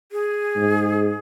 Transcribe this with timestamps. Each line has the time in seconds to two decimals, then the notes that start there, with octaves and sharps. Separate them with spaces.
0.12 G#4
0.56 G#2